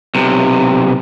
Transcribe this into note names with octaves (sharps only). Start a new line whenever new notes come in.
B1 C3